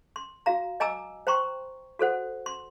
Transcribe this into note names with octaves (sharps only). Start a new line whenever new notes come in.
C6
F#4 F5 A#5
D#5 G#5 A#5 D6 E6
C5 G5 A#5 C6 C#6
F#4 A4 C5 F#5
C6